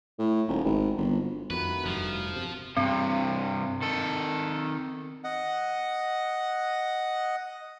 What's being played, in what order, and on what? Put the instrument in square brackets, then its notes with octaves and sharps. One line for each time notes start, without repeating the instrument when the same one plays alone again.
[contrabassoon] A2
D#1
G#1
G1
[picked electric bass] F2 [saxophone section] D#3 A3 F#4 [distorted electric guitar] B4
[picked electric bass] F1 G2 [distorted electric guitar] F3
[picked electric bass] C3
[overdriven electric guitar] G2 C3 [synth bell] C4
[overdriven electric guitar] D#3 A4
[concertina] D#5 F#5